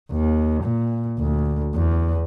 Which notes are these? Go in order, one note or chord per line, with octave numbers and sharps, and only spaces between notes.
D#2
A#2
D2
E2